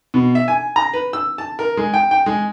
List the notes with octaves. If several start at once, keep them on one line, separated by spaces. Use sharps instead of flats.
B2
E5
G#5
A#5
B4
E6
A5
A#4
G#3
G5
G5
G#3